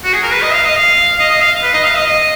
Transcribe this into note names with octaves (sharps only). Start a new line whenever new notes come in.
F#4
G#4
A#4
B4
D#5
F5
D#5
F5
D#5
D#5
F5
B4
D#5
F5
D#5
D#5